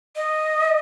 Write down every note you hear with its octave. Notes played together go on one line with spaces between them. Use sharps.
D#5